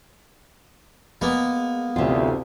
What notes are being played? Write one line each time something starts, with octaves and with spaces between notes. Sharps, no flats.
G#3 A#3 B3
A1 D2 C3 F4